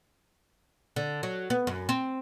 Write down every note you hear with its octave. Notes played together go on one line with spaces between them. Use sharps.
D3
F#3
B3
F#2
C4